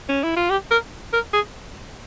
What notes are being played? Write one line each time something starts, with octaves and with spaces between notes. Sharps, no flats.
C#4
E4
F4
G4
A#4
A#4
G#4